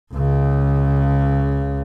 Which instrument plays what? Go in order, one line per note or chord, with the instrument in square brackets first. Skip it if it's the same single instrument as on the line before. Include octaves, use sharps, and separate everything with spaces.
[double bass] C#2 C#3